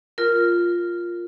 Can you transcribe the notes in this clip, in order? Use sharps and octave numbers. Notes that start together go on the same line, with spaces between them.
F4 A#4